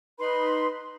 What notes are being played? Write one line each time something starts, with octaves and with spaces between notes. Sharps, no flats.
D#4 B4 B5 C6